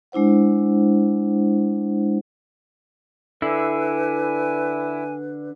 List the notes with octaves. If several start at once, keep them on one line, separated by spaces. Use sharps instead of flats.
G#3 D4 E4 C5 F#5
D3 E4 B4 G#5